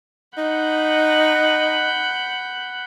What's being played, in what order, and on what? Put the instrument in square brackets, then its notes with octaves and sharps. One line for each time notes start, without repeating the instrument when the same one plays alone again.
[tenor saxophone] D#4 [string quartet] F#5 B5 G6